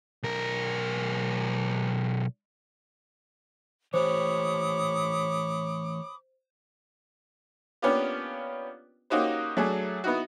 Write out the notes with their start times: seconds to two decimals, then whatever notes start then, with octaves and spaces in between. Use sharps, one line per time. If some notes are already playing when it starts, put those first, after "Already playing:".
0.23 B1 A#4
3.94 E3 A3 G4 C5 C#5 B5 D6 D#6
7.82 A#3 B3 C#4 D4 F4 G4
9.10 A#3 C#4 D#4 F#4 G4 C5
9.57 F#3 A3 D4 F#4 G#4
10.04 B3 D#4 E4 F#4